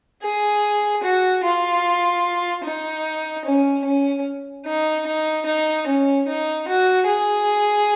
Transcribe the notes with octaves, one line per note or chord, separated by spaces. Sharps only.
G#4
F#4
F4
D#4
C#4
C#4
D#4
D#4
D#4
C#4
D#4
F#4
G#4